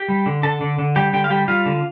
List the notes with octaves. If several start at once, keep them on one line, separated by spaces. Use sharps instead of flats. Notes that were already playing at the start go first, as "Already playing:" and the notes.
Already playing: G4 G5
G3
D3
D3 A4 A5
D3
D3
G3 G4 G5
D3 G4 G5
F5
G3 G4 G5
G3 F4 F5
D3